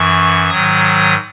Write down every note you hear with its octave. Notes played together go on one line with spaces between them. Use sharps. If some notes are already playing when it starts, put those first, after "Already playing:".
Already playing: F#2 E3 C#6
G#2 D#3 F#3 D#6
D#6